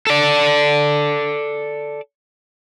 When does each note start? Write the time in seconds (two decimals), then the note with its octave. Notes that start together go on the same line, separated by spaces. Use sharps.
0.07 A4 D5